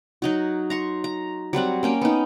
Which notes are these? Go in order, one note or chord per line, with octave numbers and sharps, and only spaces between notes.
F#3 D#4 F#4
A#5 C6 C#6
A#5
F#3 G3 C4 F#5
A#3 C#4 G5
B3 D#4